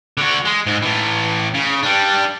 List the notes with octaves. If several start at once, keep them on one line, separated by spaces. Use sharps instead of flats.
D3 F#4
G#3
G#2 G#3
A2 E3
C#3
G3 D4